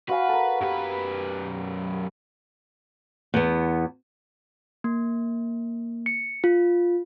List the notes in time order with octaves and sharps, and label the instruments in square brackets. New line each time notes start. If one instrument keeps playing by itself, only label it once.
[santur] F#4 F5 G#5 [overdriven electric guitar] B4
[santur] A4 A#4
[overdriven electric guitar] F#2 B4 [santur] A#3 G4
[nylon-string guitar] E2 B3
[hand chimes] A#3
C#7
F4